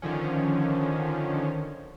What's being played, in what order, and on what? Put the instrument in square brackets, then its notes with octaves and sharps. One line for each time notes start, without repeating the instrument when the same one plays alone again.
[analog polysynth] D3 D#3 F3 C#4